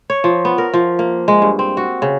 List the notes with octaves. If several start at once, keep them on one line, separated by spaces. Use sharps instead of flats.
C#5
F3
B3
A#4
F3
A#3
G#3
G2
C4
F#4
C#3